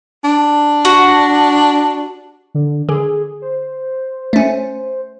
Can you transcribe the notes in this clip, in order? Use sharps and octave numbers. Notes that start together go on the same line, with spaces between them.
D4
F#4
D3
D3 G#4
C5
A3 C#4